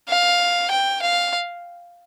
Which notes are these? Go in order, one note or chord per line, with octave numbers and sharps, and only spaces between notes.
F5
G5
F5